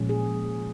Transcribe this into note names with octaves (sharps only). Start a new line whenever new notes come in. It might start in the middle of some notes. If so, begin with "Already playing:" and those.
Already playing: A#2 F3 G#3 C#4
G#4